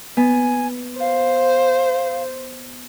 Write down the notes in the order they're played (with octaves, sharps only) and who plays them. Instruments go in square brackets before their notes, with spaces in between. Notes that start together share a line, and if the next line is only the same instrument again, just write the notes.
[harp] B3 [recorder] G#5
[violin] C5 [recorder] F5